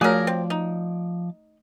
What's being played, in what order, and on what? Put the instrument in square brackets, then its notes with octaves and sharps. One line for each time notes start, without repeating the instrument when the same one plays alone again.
[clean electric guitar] F3 D5 [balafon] A3 F#4 C#5 [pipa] G#4 A#4
[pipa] C4
D#4